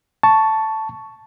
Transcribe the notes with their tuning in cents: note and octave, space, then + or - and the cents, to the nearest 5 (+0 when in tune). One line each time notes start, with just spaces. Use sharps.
A5 +0 C#6 +5